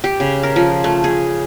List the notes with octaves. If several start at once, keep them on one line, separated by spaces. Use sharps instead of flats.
G4
C#3
A#4
F3
A3
G#4